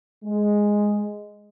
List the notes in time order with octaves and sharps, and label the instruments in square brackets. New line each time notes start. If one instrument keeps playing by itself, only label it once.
[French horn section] G#3